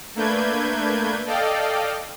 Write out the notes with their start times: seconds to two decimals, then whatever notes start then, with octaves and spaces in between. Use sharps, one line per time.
0.15 A3 A#3 D4 B4 G6 G#6
1.26 A4 D5 D#5 F5 G5